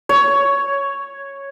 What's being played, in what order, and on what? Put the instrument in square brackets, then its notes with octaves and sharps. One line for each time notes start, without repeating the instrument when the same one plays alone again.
[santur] C#5